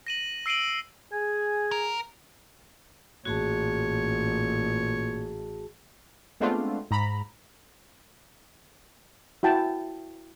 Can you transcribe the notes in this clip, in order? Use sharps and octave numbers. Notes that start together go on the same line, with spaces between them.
A#6 D#7 F#7
E6 C7 D7 D#7 F#7
G#4 G#5
A#4
A1 A#2 F#4 G#4 C#5 A5
G#3 A3 B3 C4 D4 F4
G#2 A#5 B5
E4 F#4 G5 A5